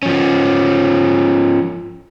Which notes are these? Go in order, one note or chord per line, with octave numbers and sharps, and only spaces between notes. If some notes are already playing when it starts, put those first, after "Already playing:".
F3 C#4